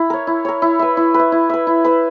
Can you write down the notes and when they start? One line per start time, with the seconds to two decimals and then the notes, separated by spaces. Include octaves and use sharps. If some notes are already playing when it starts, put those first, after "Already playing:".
Already playing: E4
0.10 A#4 C#5
0.27 E4
0.45 A#4 C#5
0.62 E4
0.79 B4 E5
0.97 E4
1.14 B4
1.19 E5
1.32 E4
1.49 B4 E5
1.67 E4
1.84 B4 E5